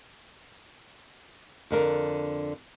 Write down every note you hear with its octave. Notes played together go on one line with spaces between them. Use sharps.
F2 D3 A#4